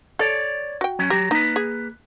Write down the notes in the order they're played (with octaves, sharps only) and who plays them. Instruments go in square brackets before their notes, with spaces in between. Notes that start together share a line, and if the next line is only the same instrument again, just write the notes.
[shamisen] A4 [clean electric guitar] C#5 D5
[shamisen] F#4 G5
[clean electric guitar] F#3 C#4
[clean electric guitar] F#3 A#5 [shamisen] G4
[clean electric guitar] A#3 B4 [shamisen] D#4
[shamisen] G#4